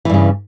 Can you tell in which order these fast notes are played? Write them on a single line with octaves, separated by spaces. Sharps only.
E3 G2 C#3